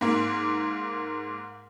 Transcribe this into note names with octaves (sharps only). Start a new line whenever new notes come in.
G#2 A#3